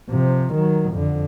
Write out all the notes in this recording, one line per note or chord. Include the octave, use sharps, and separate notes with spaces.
C3 F3
D#3 F#3
F2 D3